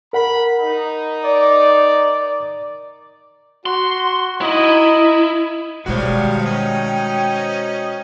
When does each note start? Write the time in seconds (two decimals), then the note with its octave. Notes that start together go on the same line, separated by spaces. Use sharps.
0.13 A#4 F#5 B5
0.59 D#4
1.25 D5
3.66 F#4 C6
4.41 D#4 E4 D#5
5.86 B2 G3 G#3 B3 F#4 C5 C#5 F5
6.45 C#4 D#4 D#5 G5